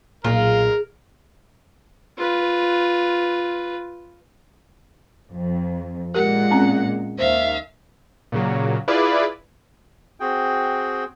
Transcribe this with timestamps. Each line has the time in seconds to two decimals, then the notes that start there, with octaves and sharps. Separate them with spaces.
0.24 B1 A#2 G#3 F4 A#4
2.18 F4 B4
5.33 F2
6.15 A#2 G#3 G4 A#4 F#5
6.51 C4 C#4
7.18 D#2 C5 E5 F5
8.32 A#2 C#3 F#3
8.88 E4 F4 G#4 B4 D5
10.20 C4 F#4 G#4 G5